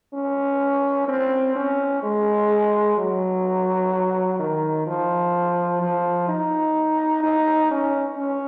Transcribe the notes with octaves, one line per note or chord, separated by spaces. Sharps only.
C#4
C4
C#4
G#3
F#3
D#3
F3
F3
D#4
D#4
C#4
C#4